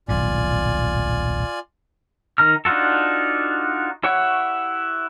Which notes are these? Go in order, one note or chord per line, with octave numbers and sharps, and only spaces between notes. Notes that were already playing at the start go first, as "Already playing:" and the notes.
D#1 B1 A2 F4 D5 G#5
D#3 A#5 F6
D4 D#4 F4 F#4 A4
E4 G4 C#5 F#5 C#6